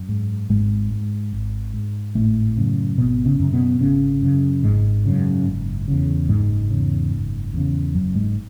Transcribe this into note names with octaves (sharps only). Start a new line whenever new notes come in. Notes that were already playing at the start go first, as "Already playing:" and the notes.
Already playing: F#2
G#2
G#1 G#2 G#3
G#2
G#1
G#2
G#1 A2 A3
F#2 C#3
G#1 B2 B3
C#3 C#4
F#2 C#3
B2 B3
G#1 C#3 C#4
F#2 C#3
G#1 G#2 G#3
F#2 C#3
F#1
E2 C#3
F#1 G#2 G#3
E2 C#3
F#1
E2 C#3
F#1 F#2 F#3
G#2 G#3